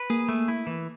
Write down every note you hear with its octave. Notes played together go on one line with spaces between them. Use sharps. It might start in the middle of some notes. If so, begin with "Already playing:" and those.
Already playing: B4
A#3 G#4
A3
E4
E3